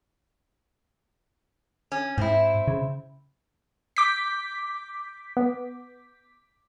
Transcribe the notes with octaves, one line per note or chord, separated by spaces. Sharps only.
C#4
G#2 C4 E4
C#3
D6 G6 B6
B3